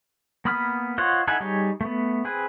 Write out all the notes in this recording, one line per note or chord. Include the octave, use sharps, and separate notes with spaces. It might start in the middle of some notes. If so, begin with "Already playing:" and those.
A#3 B3 B5 D#6 F6
F4 C5 C#5 D#5 F#5
D#4 E4 A4 F#5 G#5
G3 D#4 G#4 C#5
A3 B3
C4 G#4 B4